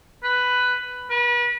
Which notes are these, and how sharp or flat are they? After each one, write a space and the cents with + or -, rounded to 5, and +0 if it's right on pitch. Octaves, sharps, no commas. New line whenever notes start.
B4 +10
B4 -35